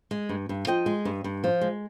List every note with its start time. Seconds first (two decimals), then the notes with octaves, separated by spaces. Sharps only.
0.11 G#3
0.29 G2
0.49 G2
0.67 F3 D#5 G5
0.86 G#3
1.05 G2
1.24 G2
1.44 F3
1.61 G#3